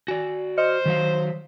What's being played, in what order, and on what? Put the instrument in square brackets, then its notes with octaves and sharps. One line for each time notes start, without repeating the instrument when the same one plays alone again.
[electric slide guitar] F#4 D5 [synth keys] G#5
[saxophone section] C5 [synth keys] D#5 F6 C#7
[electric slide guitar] D#3 F#3 F5 [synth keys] B6